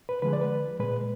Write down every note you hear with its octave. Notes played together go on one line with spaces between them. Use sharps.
B4
D3 F3 G#3 B4
D5
B4
A#2 G#3 B4